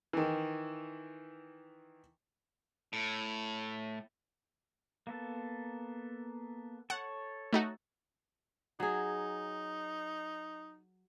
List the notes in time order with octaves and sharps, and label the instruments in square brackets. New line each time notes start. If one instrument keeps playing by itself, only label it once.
[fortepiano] D#3 E3
[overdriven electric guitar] A2
[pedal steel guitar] A#3 B3 A4
[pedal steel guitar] A4 C#5 [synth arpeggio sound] F#5
[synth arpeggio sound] A3 D#4 F#4
[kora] F#3 G#4 [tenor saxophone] D#4